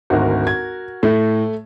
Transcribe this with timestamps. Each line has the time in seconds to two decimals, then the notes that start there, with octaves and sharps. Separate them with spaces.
0.10 G#1 D2 F#4 A#4
0.47 G#6
1.03 A2 A3